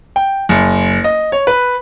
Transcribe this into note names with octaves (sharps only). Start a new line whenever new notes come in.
G5
F#1
D#5
C#5
B4